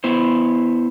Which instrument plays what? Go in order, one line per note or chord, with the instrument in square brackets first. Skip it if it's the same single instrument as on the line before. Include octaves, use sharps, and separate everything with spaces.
[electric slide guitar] B3 E4 C5